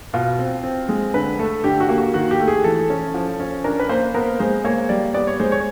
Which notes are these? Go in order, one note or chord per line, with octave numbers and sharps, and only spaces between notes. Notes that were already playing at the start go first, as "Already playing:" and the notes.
B2 F4
C4
C4
G#3
D3 B4
A3 A4
D3 G4
F#4
A#3
F#4
D#3 F#4
G4
A3
G#4
E3 A4
C#4
F3
C#4
D4 A#4
B4
A#3 C5
B3 A#4
G#3 C5
A#3 C#5
G3 D5
B3 D5
C#5
G#3 C5
C#5